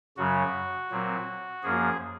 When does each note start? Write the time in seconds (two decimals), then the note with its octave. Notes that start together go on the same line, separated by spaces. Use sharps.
0.17 F#2 C#3 F#3 F#4
0.90 A#2 F#3 C4
1.63 F#2 F3 A#3 G#4